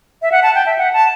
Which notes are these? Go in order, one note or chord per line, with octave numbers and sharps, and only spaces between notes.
E5
F#5
A5
G5
E5
F#5
A5